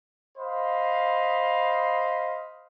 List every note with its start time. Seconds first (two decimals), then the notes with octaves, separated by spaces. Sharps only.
0.38 C5 D#5 F5 B5